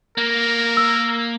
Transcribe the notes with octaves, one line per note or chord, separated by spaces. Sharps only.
A#3 A#4
E6